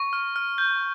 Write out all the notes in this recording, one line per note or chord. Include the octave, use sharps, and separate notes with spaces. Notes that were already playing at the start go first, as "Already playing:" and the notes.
Already playing: C#6
F6
F6
G6